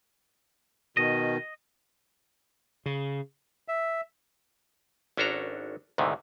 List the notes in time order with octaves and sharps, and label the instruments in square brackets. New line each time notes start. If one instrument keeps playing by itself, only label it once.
[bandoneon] B2 D#3 [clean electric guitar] D#5
[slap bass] C#3
[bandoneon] E5
[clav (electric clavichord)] G#1 C#4 D4 F#4 A4 A#5
D2 G#2 C3 D#3 E3